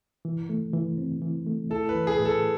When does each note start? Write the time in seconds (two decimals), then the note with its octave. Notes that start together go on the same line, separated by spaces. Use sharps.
0.25 E3
0.49 A3
0.73 E3
0.98 C4
1.22 E3
1.47 A3
1.70 E4 A4
1.89 B4
1.95 E3
2.07 G#4
2.19 A2
2.25 A4